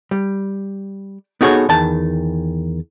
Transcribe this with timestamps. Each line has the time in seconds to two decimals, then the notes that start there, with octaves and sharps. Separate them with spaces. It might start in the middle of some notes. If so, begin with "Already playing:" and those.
0.11 G3
1.41 B3 D#4 F#4 G#4 A4 C#5
1.69 E2 D#3 A5